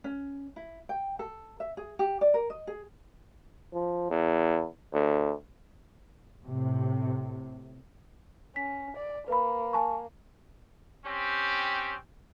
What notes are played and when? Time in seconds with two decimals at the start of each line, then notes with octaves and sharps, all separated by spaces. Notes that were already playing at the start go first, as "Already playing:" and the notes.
0.04 C#4
0.56 E4
0.89 G5
1.19 A4
1.60 E5
1.77 G#4
1.99 G4
2.21 D5
2.34 A#4
2.50 D#5
2.67 G#4
3.74 F3
4.10 E2
4.93 D2
6.45 A2 C3
8.56 C#4 B6
8.97 D5
9.28 A#3 B4 B5
9.73 G#5 A5 C#6
11.06 C4 C#4 G4